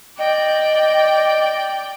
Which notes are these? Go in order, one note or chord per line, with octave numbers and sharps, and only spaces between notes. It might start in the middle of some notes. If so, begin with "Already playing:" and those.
D5 D#5 G5